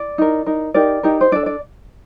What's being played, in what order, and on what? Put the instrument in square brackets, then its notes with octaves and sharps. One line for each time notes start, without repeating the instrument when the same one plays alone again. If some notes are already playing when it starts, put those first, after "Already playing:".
Already playing: [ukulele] D5
D#4 A#4
D#4 A#4
D#4 G4 A#4 D5
D#4 G4 A#4
C5
D4 A4 D5
D5